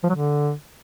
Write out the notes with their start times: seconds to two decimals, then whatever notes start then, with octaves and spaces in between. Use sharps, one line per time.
0.04 F3
0.09 F#3
0.15 D3